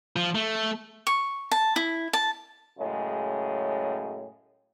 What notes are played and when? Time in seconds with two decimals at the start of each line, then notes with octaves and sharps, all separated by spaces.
0.16 F3
0.35 A3
1.07 C#6
1.51 A5
1.76 E4
2.13 A5
2.79 F#2 A2 C#3 G#3